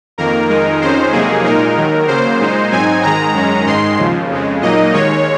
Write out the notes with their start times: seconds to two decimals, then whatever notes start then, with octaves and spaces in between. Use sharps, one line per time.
0.18 F2 D#3 A#3 A#4
0.49 F2 D#3 G#3 D#4
0.81 F2 D#3 G#3 C#4 C5
1.13 F2 C3 F#3 A#3 D#4 G#4
1.44 A#2 G#3 D#4 A#4
1.76 D#2 D#3 F#3
2.08 C#3 F#3 A#3 C5
2.40 A#2 G#3 D#4
2.71 G#2 F#3 C4 D#4 G#5
3.03 G#2 D#3 G#3 A#5
3.34 F#2 D#3 G#3 C#4
3.66 G#2 D#3 G#3 C6
3.98 D#2 C#3 F3
4.30 F2 C#3 G#3
4.61 A#2 F#3 A#3 D#4 D#5
4.93 D#2 D#3 G#3 C#5